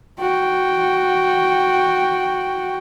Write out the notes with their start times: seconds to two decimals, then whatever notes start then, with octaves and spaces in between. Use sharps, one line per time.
0.19 F#4 G5